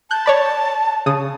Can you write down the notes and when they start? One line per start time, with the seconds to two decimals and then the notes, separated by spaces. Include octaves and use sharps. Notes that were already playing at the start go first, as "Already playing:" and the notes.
0.11 A5 F#6 G6
0.26 C#5 D5 B5
1.06 C#3 D#6